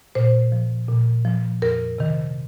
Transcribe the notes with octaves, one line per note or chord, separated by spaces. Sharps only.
A#2 C5
F3
A#2
F3
F2 A#4
C3 D#3